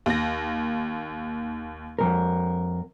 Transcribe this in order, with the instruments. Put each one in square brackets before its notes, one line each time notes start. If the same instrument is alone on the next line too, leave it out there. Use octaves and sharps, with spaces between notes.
[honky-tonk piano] D#2 A#6
[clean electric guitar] F2 G#2 A#4